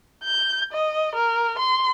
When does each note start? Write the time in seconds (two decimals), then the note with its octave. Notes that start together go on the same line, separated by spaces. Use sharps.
0.24 G6
0.72 D#5
1.15 A#4
1.58 C6